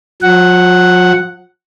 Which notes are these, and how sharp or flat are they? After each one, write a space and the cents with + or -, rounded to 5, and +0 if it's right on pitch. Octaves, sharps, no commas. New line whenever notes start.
F3 +45 F#5 +0